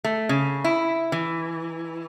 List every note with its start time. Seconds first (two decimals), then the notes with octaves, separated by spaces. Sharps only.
0.04 A3
0.29 C#3
0.64 E4
1.12 E3